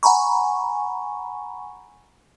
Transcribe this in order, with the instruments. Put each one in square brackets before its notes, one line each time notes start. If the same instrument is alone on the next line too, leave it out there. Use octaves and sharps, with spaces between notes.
[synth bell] F#5 G#5 A#5 B5 C#6